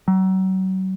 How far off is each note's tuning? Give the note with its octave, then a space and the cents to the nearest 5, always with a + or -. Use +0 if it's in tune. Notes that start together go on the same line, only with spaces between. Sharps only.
F#3 +35